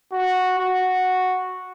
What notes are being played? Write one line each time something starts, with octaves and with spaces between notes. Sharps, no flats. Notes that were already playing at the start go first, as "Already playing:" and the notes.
F#4
F#4